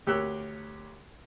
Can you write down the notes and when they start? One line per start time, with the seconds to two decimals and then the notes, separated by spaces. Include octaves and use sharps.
0.07 D2 G4 A#4 C#5 E6 F#6